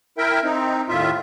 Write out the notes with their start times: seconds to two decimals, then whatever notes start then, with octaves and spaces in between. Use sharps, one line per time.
0.18 E4 A#4 E5 G5
0.44 C4 D#4
0.89 D#2 A2 F4 E5